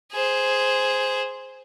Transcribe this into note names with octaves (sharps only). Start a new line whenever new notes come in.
G#4 C5